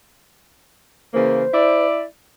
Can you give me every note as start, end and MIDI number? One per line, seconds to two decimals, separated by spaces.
1.14 1.43 49
1.14 1.43 52
1.14 1.43 58
1.14 1.86 72
1.54 2.02 64
1.54 2.02 74